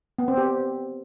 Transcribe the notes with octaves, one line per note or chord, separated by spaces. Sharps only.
B3
C4
G4